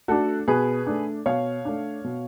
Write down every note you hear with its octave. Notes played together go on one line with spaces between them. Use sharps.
A3 D4 F#4 A4
B2 G#4 B4
A3 D4
B2 C#5 F5
A3 D4
B2